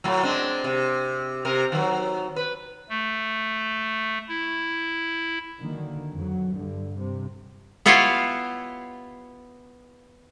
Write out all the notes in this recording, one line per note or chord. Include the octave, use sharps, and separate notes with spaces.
A2 F#3
G#3 C4 D4
C3
C3 A#4
D#3 F#3
B4
A3
E4
D3 D#3 F#3 A#3
F2 F#3
G2 D3
G2 C3
B3 E4 F4 G4 C#5 F5